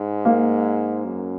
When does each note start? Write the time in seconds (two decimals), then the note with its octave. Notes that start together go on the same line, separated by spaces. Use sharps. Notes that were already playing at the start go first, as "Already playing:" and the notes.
Already playing: G#2
0.25 A#3
1.05 F#2